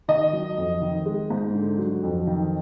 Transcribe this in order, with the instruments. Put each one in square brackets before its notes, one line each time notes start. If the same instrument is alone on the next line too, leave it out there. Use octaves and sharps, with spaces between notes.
[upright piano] D#3 D#5
F#3
F2
D#3
G#3
G#2
D3
F#3
F2
D#3